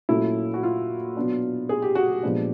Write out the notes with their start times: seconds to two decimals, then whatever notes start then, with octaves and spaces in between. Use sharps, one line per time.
0.09 A#2 F#3 A3 C#4 E4
0.54 F#4
0.63 F4
1.17 B2 F#3 B3 D4
1.69 G#4
1.82 G4
1.95 F#4
2.09 G4
2.23 A#2 F3 G#3 B3 D4